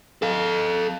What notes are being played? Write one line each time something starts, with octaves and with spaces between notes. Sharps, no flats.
A4 F5